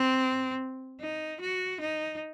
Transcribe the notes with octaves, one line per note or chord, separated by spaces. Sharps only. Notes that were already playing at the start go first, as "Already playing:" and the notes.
Already playing: C4
D#4
F#4
D#4